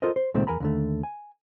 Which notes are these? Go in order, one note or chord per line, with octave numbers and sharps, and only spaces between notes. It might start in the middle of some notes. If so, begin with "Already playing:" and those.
F4 A4 A#4 C5 D#5
C5
C#2 A#2 D#3 G#3 A3 C4
E2 A#4 G#5 A#5 B5
D#2 D3 A3
G#5